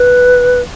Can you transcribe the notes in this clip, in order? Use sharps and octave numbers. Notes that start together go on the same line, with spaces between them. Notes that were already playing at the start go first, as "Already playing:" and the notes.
Already playing: B4